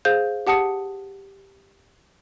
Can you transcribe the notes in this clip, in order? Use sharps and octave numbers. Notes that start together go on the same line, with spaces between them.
G#4 C5 F5 G6
G4 F#5 A5 D#6 C#7